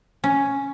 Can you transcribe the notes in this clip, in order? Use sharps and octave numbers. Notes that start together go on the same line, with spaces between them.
C#4